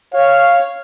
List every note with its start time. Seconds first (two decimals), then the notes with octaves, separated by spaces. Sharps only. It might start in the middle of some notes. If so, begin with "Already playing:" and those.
0.14 C#5 F5